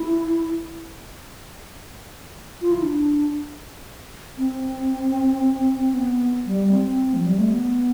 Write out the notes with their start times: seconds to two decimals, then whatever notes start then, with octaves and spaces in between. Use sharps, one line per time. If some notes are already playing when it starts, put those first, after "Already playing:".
Already playing: E4
2.62 F4
2.72 E4
2.82 D4
4.38 C4
5.94 B3
6.46 G3
6.71 C4
7.14 F3
7.26 G3
7.38 A3
7.50 B3